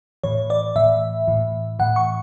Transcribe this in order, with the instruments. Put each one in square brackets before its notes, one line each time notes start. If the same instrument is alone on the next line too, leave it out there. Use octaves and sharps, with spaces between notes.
[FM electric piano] A2 E3 C#5
D5
A2 E3 E5
A2 E3
A2 E3 F#5
C#6